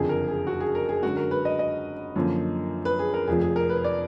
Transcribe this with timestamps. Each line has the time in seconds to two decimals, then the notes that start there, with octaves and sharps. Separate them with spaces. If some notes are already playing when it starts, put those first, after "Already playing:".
Already playing: F#1 F2 D3 G#4
0.09 A#4
0.28 G#4
0.47 F#4
0.61 G#4
0.75 A#4
0.89 G#4
1.03 F#2 D3 G#3 F#4
1.17 A#4
1.31 B4
1.45 D#5
1.59 D#5
2.16 F#2 D3 F3 A#3
2.85 B4
2.99 G#4
3.14 A#4
3.27 F1 F2 F3 G#4
3.41 G#4
3.56 A#4
3.70 B4
3.84 D5